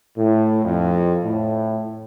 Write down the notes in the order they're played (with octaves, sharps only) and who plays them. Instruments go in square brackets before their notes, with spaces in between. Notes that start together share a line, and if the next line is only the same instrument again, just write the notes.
[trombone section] A2
F2
A2